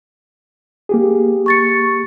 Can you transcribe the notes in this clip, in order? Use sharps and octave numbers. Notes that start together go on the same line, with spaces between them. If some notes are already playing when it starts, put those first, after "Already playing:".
A#3 G4 G#4
C#6 A6 C#7